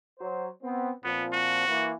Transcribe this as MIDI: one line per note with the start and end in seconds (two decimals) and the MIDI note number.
0.19 0.47 54
0.19 0.47 72
0.63 0.90 59
0.63 0.90 60
1.04 1.65 46
1.04 1.65 53
1.04 1.26 59
1.04 1.65 60
1.33 1.92 66
1.67 1.92 52
1.67 1.92 58